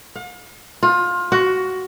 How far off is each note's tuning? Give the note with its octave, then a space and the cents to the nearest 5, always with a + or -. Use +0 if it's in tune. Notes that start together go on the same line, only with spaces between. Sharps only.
F5 +45
F4 +25
F#4 +15